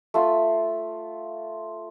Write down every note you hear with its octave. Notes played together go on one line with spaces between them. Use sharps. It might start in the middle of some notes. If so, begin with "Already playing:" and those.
A3 F4